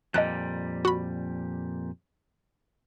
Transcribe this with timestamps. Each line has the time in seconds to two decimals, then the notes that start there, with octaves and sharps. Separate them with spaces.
0.14 F2 A#2 G3 D#5 A5 F#6
0.85 F#4 B5